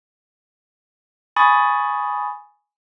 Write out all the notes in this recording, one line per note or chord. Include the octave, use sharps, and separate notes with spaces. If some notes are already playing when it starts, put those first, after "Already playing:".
G#5 B5 C#6 D#6 A6